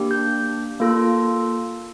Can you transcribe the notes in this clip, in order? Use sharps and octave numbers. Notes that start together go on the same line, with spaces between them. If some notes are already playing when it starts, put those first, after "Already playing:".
Already playing: A#3 D4 G4
G6
A#3 F4 A4